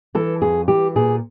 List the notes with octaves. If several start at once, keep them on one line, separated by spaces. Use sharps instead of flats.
E3 A4
F2 G#4
E3 G4
A#2 G#4